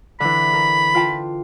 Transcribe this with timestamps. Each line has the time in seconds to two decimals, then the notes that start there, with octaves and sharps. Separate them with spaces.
0.20 D3 E3 B5
0.54 A#4
0.95 F4 G5 A5